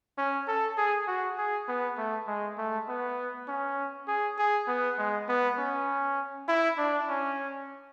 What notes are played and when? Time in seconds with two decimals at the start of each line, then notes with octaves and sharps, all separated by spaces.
0.18 C#4
0.48 A4
0.78 G#4
1.08 F#4
1.38 G#4
1.68 B3
1.98 A3
2.27 G#3
2.58 A3
2.88 B3
3.48 C#4
4.08 G#4
4.38 G#4
4.68 B3
4.98 G#3
5.28 B3
5.58 C#4
6.48 E4
6.78 D4
7.09 C#4